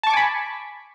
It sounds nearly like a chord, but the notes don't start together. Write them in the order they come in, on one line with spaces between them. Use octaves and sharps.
A5 C#6 D6 G#5 B5